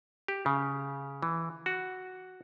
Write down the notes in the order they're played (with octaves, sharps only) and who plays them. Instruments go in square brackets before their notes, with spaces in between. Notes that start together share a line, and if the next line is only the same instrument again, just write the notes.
[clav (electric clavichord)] G4
C#3
E3
F#4